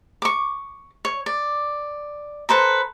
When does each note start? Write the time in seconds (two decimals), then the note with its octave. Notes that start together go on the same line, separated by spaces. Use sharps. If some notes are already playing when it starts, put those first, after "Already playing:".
0.22 C#6 D6
1.05 C#5
1.26 D5
2.49 A4 B4 C5 A#5